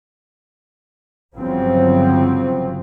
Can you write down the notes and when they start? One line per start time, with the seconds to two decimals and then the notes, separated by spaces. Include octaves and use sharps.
1.35 G1 C#3 F3 F#3 C4